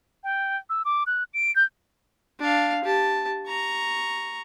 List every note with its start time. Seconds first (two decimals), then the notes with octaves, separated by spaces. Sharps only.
0.24 G5
0.70 E6
0.85 D6
1.07 F#6
1.34 D7
1.56 G6
2.40 D4 F5
2.84 G4 A5
3.46 A#5 C#6